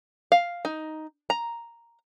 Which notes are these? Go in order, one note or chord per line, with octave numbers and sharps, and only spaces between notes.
F5
D#4
A#5